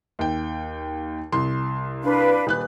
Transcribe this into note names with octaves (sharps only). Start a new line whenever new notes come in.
D#2 G5
C2 C6
D4 B4 F5
D#1 B4 F#6